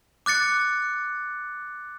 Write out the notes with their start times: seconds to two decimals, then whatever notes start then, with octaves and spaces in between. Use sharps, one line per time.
0.26 D6 F#6 A6 C#7